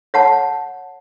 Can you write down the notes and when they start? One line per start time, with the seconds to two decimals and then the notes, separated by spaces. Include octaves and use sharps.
0.14 C#5 F#5 A5